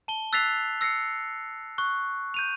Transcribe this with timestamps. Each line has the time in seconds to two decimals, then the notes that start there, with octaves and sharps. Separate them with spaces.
0.08 A5 G7
0.33 E6 F#6 A6 B6 C7 F7
0.81 E6 A#6 C7 C#7
1.78 C#6 F#6
2.34 G6 D#7 F7